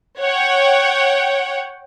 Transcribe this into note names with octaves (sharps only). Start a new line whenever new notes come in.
C#5 F#5 G5